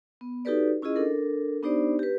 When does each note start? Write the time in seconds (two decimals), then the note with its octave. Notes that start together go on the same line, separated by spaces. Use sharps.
0.21 B3
0.45 D#4 F#4 G4 A4 B4 D5
0.82 C#4 E4 F4 G#4 D#5
0.96 D4 A4 A#4
1.62 B3 D4 D#4 G4 C5 D5
1.99 G4 B4